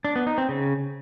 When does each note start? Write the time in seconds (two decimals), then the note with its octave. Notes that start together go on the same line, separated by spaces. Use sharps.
0.05 D4
0.16 B3
0.27 D#4
0.38 C4
0.49 C#3